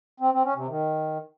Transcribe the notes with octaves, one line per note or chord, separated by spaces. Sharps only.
C4
C4
C#4
C3
D#3